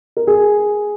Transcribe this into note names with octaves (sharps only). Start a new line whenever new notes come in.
A#4
G#4